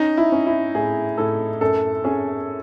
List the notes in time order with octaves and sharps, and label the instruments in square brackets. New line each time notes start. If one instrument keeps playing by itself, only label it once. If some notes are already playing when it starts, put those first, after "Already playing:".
Already playing: [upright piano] C#4 [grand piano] D#4
[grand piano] E4
[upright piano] C#4
[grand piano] E4
[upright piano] A2 [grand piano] G#4
[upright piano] A2 [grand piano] A4
[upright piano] F#2 [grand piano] A4
[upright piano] C#4 [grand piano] G#4